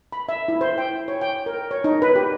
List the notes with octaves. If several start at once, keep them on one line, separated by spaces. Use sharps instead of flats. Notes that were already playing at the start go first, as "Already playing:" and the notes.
B5
E5
E4
C5
G5
C#5
G5
A#4
C#5
D#4
B4
G4